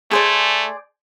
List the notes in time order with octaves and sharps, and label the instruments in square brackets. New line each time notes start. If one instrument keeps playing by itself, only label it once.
[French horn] A3 [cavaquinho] G#4 C5 D5